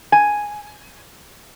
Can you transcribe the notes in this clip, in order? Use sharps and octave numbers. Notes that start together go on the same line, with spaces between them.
G#5